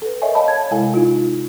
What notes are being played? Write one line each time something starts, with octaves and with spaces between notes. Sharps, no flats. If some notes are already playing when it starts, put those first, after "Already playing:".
A4 B4
A#4 C#5 D#5 E5 G#5
C#5 D#5 F5 A5 B5
G#6
C3 G#3 E4 A4 F5 G#5
D#4 F4